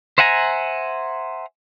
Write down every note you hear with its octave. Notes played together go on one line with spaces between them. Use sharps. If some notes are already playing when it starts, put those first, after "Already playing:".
C5 E5 F#5 G#5 A#5